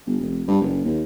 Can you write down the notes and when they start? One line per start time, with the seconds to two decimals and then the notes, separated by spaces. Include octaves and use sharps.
0.06 G1
0.21 F1
0.48 G2
0.62 F#1
0.85 D#2